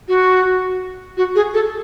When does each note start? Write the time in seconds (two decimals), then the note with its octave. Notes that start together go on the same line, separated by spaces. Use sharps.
0.08 F#4
1.17 F#4
1.35 G#4
1.54 A4